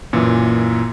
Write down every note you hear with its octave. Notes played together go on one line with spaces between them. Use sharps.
F#2 A#2 E3